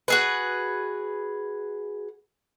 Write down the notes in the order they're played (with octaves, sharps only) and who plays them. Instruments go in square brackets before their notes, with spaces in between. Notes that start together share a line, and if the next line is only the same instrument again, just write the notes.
[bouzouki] F#4 G#4 B4